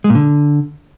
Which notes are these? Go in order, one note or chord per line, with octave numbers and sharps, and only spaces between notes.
G#3
A#2
D3